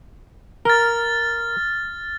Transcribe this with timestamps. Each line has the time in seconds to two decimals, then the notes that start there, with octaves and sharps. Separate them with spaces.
0.65 A#4 F6 A6